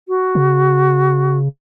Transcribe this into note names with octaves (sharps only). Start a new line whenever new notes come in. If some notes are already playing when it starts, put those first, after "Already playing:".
F#4
C#3